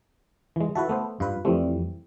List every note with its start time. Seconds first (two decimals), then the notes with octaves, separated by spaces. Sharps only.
0.56 E3 G#3
0.75 E4 F#4 A4 B4 E5
0.89 A3 B3 C5
1.20 G2 F4 B4
1.45 F2 E3 G3 A3 C4